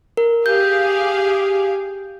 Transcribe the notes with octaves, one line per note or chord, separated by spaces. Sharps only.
A#4
G4 G#4 F5 G6